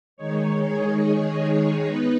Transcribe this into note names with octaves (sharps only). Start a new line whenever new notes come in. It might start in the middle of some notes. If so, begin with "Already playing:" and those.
D#3 G#3 D#4 C#5
G#4
B3 D#4 B4